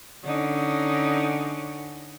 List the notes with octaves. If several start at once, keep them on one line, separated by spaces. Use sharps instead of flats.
D3 C#4 D#4